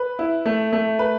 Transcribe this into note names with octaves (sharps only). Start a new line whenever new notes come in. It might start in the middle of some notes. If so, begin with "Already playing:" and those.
Already playing: B4
E4
A3
A3
B4